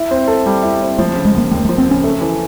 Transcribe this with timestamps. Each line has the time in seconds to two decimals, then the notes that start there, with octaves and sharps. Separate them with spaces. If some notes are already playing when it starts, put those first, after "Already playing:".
Already playing: E4
0.11 C4
0.28 A4
0.46 G3
0.63 E4
0.82 C4
0.98 F3 A3
1.16 C#3
1.25 G#3
1.34 D#2 A#3
1.51 D#2 A3
1.65 A3
1.69 F3
1.78 C4
1.87 C#3 C#4
2.04 A3
2.21 E3